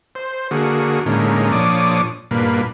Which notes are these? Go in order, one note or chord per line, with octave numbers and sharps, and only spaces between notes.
C5
D3 A#3 F#4 G#4
A2 D3 G#3 A#3 C#4 D#4
A#2 F3 D4 C#5 D6 D#6
G2 A#2 A#3 B4